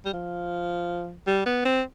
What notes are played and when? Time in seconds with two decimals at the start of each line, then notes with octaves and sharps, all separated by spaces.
0.05 G3
0.13 F3
1.27 G3
1.46 B3
1.65 C4